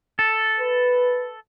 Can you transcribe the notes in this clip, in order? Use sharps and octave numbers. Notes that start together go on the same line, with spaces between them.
A4
B4